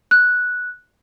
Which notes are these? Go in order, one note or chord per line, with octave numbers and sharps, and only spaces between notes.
F#6